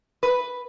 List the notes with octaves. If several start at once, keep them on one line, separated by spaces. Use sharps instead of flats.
B4